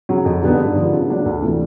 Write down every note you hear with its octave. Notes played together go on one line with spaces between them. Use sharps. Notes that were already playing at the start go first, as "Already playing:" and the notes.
C#3 F#3
F2
D3 G3 B3 D#4
G2
D3 F3 G#3
C#3
F#3 A#3 D4
D2
C3 E3 A3